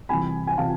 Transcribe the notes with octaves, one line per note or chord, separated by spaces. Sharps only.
C2 C3 E3 G#5 B5
G#5
C3 E3 F5 A5